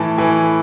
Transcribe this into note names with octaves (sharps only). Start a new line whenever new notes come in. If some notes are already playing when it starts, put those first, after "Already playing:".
Already playing: A2 E3 A5
A2 E3 G#5